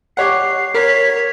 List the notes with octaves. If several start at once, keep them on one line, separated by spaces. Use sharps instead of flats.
G4 C#5 F#5 C7
A#4 C#5 B6